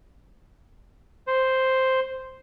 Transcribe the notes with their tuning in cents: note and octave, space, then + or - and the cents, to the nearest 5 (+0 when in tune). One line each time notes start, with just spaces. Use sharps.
C5 +0